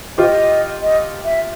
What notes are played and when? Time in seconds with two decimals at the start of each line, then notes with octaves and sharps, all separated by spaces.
0.18 F4 G4 D#5
0.82 D#5
1.25 E5